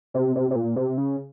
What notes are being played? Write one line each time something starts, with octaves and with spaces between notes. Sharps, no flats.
C3
C3
C3
A#2
C3
C#3